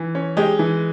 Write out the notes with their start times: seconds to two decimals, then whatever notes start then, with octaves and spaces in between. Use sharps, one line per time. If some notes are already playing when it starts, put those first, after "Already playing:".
Already playing: E3
0.15 C#4
0.37 G#3 G4
0.59 E3